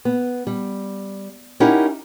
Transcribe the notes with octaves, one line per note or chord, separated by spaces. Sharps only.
B3
G3
C#4 D#4 E4 G4 A#4 F#5